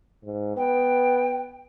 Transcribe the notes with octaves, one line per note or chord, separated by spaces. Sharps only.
G#2
B3 G5